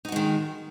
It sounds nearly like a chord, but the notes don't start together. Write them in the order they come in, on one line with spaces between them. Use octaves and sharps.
D#4 F#4 G#3 D#3